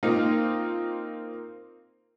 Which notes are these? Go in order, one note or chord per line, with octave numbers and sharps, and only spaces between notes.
A#3 C4 D#4 F4